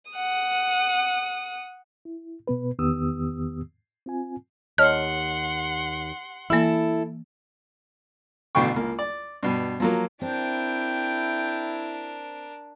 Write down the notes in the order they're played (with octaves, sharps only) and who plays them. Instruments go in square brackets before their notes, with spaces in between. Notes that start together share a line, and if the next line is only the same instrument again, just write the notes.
[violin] F#5 D#6
[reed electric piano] E4
B2 B3 B4
E2 D#3 B3 G4 D#6 E6
C4 F4 G#5
[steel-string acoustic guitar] D#2 [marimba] C#5 D#5 A5 [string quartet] F#5 C6 [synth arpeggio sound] F6
[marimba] E3 A#3 [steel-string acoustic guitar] E4 A4
[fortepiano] A1 B2 D3 G5 C#6
C#2 A#3
D5
G2 B2
F3 F#3 A#3
[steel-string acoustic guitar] C4 [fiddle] D4 A#4 [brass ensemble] E4 [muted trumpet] G5